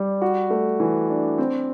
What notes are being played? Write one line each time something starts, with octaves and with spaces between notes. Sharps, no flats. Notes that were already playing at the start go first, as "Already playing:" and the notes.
Already playing: G3
F#4
A3
E3
D4
C4